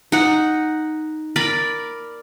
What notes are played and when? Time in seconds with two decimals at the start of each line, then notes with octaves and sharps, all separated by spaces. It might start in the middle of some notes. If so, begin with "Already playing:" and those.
0.12 D#4 F#5
1.36 A#4 D5 B5